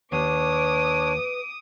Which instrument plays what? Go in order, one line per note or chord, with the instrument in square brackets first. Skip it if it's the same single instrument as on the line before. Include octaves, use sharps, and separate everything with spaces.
[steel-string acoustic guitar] D#2 [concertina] D4 C#5 [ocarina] B4 [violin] D6 D#6